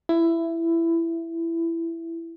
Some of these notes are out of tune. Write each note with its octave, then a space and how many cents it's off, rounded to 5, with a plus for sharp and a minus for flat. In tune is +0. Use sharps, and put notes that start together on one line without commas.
E4 +15